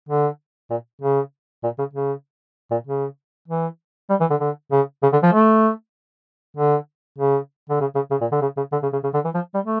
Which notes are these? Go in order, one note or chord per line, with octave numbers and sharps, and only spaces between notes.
D3
A#2
C#3
A#2
C#3
C#3
A#2
C#3
E3
G3
E3
D3
D3
C#3
C#3
D3
F3
A3
D3
C#3
D3
C#3
C#3
C#3
A#2
D3
C#3
C#3
D3
C#3
C#3
C#3
D3
E3
F3
G3
A3